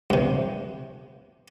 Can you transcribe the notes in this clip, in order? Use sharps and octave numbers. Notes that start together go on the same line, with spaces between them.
G2 C3